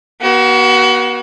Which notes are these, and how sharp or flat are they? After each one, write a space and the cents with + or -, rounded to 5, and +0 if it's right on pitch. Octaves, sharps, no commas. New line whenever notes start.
B3 -40 F#4 +30